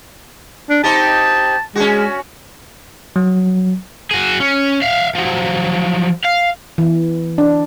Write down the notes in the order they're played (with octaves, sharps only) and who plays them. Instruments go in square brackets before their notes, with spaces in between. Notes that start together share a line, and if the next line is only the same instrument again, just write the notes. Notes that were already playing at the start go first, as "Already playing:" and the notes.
[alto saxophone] D4
[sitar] C4 D#4 G4 [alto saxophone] A5
[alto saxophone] G#3 [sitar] C#4 F#4
[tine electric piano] F#3
[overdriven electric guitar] F#4 G#4
C#4
E5 F5
F3 F#3
F5
[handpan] E3
D4